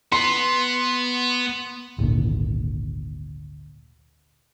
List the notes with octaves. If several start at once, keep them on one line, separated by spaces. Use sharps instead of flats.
B3 C6
G#1 D2 A#2 D3